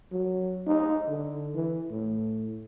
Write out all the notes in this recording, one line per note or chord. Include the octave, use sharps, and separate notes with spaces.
F#3
D#4
D3
E3
A2